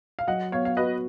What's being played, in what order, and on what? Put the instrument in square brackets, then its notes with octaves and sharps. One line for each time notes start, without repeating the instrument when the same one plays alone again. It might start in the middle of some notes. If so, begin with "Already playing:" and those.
[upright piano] F5
[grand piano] F#3 [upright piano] D#5 F#5
[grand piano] B3 [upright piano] C#5 F5
[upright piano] F5
[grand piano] F#4 [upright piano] B4 D#5